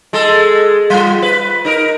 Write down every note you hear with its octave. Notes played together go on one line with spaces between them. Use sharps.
G#3 A4
G3 F4
B4
D#4 A#4